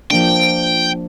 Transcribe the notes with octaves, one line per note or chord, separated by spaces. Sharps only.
F3 A#3 D4 G5